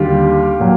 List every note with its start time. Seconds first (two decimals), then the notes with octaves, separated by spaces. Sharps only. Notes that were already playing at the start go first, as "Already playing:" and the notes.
Already playing: D#2 D3 G3 F4 G4
0.60 A#2 F#3